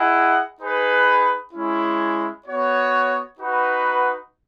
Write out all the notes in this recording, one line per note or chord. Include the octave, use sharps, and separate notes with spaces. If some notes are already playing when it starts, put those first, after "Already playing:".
Already playing: E4 G#4 D#5 F#5
D#4 G#4 B4
G#3 C#4 E4
B3 F#4 C#5
D#4 F#4 B4 F#5